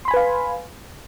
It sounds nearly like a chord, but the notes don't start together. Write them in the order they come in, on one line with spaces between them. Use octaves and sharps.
C6 B5 G#5 B4 F5